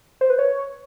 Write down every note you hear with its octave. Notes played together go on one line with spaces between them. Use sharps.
C5
B4
C#5